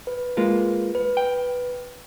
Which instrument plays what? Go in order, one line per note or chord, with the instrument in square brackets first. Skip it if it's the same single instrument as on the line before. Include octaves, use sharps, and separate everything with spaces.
[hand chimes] B4
[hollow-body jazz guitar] G#3 A#3 F4
[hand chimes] B4
[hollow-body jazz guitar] G5